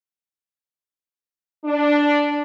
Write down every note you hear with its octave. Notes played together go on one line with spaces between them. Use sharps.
D4